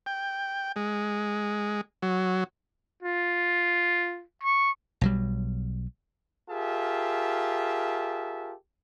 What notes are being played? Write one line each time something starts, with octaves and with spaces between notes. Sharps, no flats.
G5
G#3
F#3
F4
C#6
B1 F#3 G3
F4 G4 G#4 A#4 E5 A5